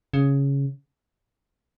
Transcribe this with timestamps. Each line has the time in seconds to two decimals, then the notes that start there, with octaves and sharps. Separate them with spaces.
0.13 C#3